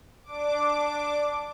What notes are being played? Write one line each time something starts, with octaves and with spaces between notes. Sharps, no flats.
D4 D6